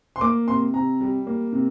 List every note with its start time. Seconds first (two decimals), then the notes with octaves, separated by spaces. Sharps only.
0.16 C6
0.21 A#3 D6
0.47 C3 C6
0.73 C3 A#5
1.00 G3
1.27 A#3
1.52 C3